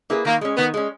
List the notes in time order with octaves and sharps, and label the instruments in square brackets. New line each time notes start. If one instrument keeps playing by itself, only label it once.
[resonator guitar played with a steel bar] A#3 E4 G#4 B4
[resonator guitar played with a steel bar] D#3 [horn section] A#3
[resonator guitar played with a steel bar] G#3 C#4
[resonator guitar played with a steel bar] D#3 [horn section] B3
[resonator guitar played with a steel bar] G#3 C#4